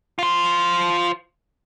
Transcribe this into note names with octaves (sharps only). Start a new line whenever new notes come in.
F4 C5